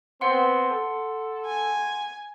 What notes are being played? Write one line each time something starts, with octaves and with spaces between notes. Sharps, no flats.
B3 C4 F#5 C6
A4
G#5